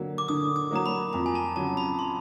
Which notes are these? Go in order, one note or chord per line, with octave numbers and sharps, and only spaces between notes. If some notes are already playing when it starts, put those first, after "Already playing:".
Already playing: D3 F#3 A#3
D6
D3 D#6
D#6
F#3 A#3 A#5
B5
F2 A#5
G#5
A5
C#3 F#3 A5
B5
C6